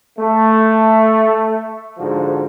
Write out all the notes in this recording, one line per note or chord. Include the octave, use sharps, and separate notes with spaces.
A3
G#2 D3 F3 F#4